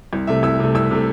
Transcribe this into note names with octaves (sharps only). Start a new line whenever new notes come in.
C2
C3 A3 E5
C2 E6
C3 A3
C2 E6
C3 A3